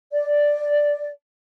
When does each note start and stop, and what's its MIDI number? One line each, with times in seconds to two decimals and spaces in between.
0.13 1.09 74